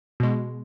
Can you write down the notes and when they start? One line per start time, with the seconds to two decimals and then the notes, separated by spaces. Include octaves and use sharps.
0.20 B2 G#3